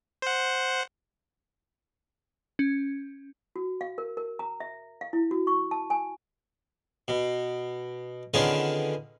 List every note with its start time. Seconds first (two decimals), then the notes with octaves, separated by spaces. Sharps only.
0.22 C5 F#5
2.59 C#4
3.56 F#4
3.81 F5
3.98 A#4
4.17 A#4
4.39 A#5
4.60 E5
5.01 F5
5.13 E4
5.31 F#4
5.47 C#6
5.71 A5
5.90 G#5
7.08 B2
8.34 D3 D#3 B3 C#4 F4 G#4